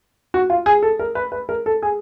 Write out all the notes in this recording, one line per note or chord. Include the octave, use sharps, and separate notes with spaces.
F#4
F4
G#4
A4
A#4
B4
B4
A#4
A4
G#4